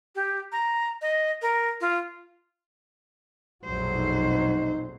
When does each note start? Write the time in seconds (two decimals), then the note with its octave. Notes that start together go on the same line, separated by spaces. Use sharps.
0.15 G4
0.52 A#5
1.02 D#5
1.42 A#4
1.81 F4
3.65 A#1 F2 B2 F#3 C5
3.96 D#4